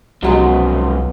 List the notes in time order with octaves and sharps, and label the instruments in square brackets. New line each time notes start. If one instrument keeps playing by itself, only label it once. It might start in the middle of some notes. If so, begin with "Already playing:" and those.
[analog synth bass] C2 [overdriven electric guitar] G#2 F3 [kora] B2 F#3 G#3